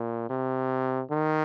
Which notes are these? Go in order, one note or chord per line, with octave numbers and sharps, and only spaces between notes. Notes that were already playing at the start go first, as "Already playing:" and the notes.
Already playing: A#2
C3
D#3